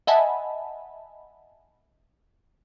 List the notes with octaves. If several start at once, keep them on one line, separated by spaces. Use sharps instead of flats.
D#5 E5 F#5 G#5 A5 B5